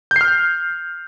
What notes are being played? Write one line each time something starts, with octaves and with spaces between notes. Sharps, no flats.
F6 G6 C7